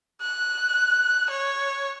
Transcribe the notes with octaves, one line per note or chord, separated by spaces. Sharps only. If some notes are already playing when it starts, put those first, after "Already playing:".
F#6
C#5